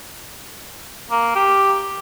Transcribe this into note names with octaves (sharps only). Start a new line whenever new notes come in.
A#3
G4